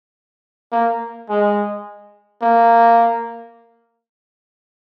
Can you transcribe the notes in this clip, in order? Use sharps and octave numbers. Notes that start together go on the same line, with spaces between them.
A#3
G#3
A#3